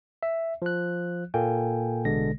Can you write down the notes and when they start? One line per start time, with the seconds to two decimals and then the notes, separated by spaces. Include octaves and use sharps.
0.23 E5
0.62 F3 F#6
1.34 A#2 A#3 A4 G5 G#5
2.05 A1 B2 D3 G#3 A#6